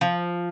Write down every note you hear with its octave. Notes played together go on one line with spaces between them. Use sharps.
F3